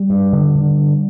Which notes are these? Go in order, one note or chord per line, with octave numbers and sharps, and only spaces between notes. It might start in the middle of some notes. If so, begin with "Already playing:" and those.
Already playing: G3
G2
D3
D3